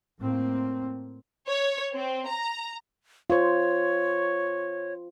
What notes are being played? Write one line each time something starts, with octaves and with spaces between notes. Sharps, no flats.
A2 A#3 C4
C#5
C4
A#5
F4 C5 C#5